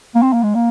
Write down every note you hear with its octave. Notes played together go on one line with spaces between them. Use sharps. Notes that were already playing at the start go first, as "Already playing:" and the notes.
A#3
C4
A#3
G#3
A#3